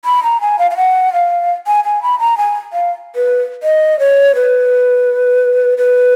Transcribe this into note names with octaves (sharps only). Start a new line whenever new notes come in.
B5
A#5
G#5
F5
F5
F#5
F5
G#5
G#5
B5
A#5
G#5
F5
B4
D#5
C#5
B4
B4